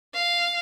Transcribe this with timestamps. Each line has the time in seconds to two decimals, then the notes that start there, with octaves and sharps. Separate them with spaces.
0.14 F5